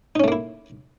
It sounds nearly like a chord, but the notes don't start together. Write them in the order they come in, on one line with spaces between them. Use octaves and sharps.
D#4 C#4 A3 A#3 E4